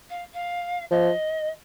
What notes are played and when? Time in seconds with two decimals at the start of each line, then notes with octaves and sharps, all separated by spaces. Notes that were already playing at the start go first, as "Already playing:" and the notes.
0.09 F5
0.33 F5
0.91 F3 D#5